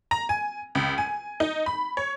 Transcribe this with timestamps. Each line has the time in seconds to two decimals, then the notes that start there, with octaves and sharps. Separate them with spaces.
0.11 A#5
0.29 G#5
0.75 C#2
0.98 G#5
1.40 D#4
1.66 B5
1.97 C#5